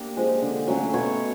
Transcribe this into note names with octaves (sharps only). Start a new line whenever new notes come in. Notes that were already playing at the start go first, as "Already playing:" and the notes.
Already playing: A#3 D4 G4
F3 G#3
D3
F#3 A3 C#4
B2 C#5